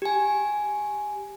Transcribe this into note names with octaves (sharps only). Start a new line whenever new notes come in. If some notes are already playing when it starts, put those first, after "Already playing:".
G4 G#5